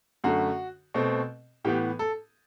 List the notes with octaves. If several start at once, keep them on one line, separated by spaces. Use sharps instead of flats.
F#2 D3 A3 F#4
B2 A3 C4
A2 E3 B3 G4
A4